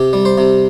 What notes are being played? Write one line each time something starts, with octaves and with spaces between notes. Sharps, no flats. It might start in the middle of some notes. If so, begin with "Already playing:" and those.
Already playing: C3 G4
G3
C5
C3